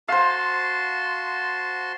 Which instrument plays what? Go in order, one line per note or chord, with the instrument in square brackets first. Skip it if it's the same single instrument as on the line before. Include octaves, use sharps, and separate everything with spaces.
[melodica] F#4 A5 C6 [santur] C5 F5